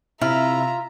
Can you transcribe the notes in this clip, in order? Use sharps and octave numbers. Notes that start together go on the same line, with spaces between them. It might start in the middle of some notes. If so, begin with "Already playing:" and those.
C3 E4 F4 E5 A#5